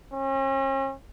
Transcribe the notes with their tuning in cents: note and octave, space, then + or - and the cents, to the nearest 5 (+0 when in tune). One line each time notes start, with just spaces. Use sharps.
C#4 -40